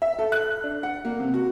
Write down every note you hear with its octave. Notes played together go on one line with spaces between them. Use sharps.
E5
A4
F#6
D4
F#5
A#3
C3
F#4